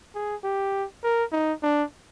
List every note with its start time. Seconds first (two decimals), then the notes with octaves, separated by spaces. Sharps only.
0.15 G#4
0.44 G4
1.03 A#4
1.32 D#4
1.63 D4